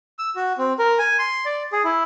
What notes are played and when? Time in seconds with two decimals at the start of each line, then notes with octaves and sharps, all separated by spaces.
0.19 E6
0.36 F#4
0.58 C4
0.79 A#4
0.99 G#5
1.19 C6
1.46 D5
1.72 G#4
1.85 E4